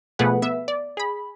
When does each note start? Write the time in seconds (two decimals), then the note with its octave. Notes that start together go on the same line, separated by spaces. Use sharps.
0.19 B2 F3 A3 G#4 B4 F#5
0.42 B3 E5
0.68 D5
0.97 G#4 B5